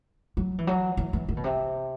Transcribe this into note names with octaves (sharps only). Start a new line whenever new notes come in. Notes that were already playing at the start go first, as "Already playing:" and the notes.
F#3
E3
F#3
E3
E3
D#3
B2
C3